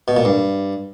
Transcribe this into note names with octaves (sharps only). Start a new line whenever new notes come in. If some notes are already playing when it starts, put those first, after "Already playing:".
B2
A#2
G2